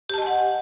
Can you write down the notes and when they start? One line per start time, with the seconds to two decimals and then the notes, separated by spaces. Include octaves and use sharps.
0.09 G4
0.14 A5
0.18 D#5
0.22 G#5
0.26 F#5